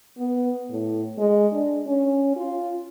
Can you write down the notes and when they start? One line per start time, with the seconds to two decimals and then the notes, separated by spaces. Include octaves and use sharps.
0.18 B3
0.71 A2
1.18 G#3
1.52 D4
1.87 C#4
2.36 F4